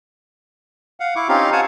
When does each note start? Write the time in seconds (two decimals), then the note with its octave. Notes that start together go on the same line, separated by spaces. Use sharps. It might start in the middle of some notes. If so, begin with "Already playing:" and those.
1.00 F5 F#5
1.16 E4 C#6 D6
1.29 C4 C#4 D#4 F4 G4 F5
1.53 F5 F#5 G#5 A5 C#6